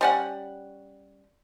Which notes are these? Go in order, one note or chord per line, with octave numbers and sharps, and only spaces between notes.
G3 C#4 F#5